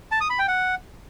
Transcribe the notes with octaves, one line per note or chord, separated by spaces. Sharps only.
A5
D#6
B5
G5
F#5